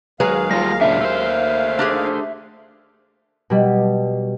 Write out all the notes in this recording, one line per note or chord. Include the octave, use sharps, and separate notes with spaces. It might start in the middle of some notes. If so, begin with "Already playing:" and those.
D#2 F#3 G#3 G#4 B4 F5
G3 F4 A#6
A#2 C#3 D4 E5
A3 C5
D4 G4 G#4
B2 G3